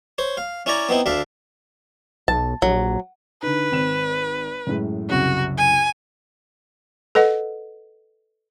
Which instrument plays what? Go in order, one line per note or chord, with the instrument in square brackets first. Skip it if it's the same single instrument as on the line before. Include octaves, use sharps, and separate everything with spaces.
[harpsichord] C5 C#5
F5
C#4 E4 C#5 D5 A#5
B3 C4 D#4 E4
D2 D4 E5 F5
[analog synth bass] B1 [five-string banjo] A5
[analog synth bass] A#1 [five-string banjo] F#3
[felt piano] D3 D#4 [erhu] B4
[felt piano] G#1 C4 E7
F#2 A2 G#3
[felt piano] C2 F#2 C#3 [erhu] F#4
[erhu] G#5
[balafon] A4 B4 D#5 F#5